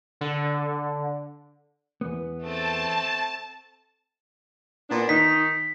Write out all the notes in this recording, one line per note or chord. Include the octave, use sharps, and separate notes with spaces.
D3
E2 B3
A3 C4 A5
A#2 B3 D4
D#3 D#4 B6